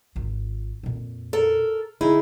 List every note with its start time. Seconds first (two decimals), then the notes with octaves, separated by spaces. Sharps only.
0.16 G#1 F4
0.83 F2 A#2
1.33 A4 A#4
2.01 D3 D#4 E4 G#4